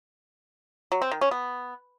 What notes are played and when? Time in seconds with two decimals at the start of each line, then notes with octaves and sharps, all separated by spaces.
0.92 F#3
1.02 C4
1.11 D#3
1.21 C#4
1.31 B3